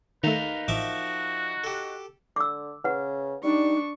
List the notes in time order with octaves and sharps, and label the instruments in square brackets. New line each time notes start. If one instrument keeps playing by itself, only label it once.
[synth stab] D#3 A3 [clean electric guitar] D#4 A#4 F5 [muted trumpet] B4
[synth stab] A1 [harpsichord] F3 E5 D6 [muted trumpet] F#4
[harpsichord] G4 A4
[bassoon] D3 [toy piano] D6 E6
[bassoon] C#3 [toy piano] B4 F#5
[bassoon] G3 [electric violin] D4 C#6 [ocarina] D#4